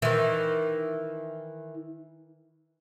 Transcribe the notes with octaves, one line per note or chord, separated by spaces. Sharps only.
D#3 E3